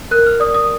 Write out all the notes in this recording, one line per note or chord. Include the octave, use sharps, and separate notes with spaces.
A#4 F#6
F6
D5 D#6
D#6